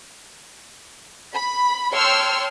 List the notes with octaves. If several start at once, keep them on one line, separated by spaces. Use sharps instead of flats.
B5
C#5 G5 A5 C6 E6 F6